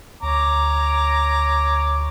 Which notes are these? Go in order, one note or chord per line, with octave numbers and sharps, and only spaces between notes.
D2 C#5 A#5 D6